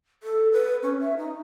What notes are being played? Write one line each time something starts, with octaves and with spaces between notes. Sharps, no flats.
A4
B4
C#4
E5
D#4